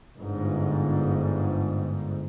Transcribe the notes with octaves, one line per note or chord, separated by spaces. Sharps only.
G1 G#2